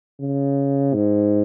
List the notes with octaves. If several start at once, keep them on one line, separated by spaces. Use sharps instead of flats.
C#3
G#2